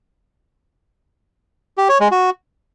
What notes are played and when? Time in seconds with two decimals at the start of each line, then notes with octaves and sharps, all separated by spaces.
1.78 G4
1.89 C#5
2.00 G#3
2.11 F#4